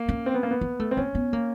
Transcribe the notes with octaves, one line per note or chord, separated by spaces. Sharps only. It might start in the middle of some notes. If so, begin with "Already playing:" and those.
Already playing: A#3
C#4
C4
B3
A#3
B3
A#3
A3
C4
A#3 C#4
B3
A#3